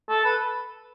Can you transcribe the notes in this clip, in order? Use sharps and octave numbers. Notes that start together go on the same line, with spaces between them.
A4
B4